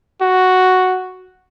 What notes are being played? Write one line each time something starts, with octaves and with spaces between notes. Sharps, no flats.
F#4